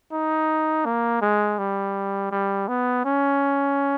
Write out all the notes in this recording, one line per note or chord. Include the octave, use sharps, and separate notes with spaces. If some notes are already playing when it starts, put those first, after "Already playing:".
D#4
A#3
G#3
G3
G3
B3
C#4